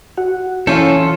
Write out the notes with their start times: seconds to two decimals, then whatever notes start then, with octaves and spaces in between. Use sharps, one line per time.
0.18 F#4 F#5
0.67 E3 C#4 E4 F4 A4 C#5 F5 G6